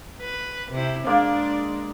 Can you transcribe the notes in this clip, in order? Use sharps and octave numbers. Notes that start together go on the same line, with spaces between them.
B4
C3 E4
G#3 A#3 D4 D5